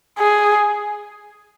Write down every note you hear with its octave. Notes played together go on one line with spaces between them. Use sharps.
G#4